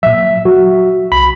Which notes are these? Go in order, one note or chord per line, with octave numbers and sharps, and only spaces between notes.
A#2 F#3 E5
F#3 F#4
C2 B5